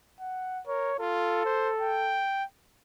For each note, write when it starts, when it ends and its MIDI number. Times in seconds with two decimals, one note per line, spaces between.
0.20 0.61 78
0.67 0.92 70
0.67 0.98 73
1.00 1.45 65
1.00 2.27 69
1.45 1.71 72
1.79 2.44 79